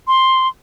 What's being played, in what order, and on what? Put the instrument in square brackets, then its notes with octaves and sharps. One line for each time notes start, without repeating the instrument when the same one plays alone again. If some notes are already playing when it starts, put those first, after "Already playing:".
[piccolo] C6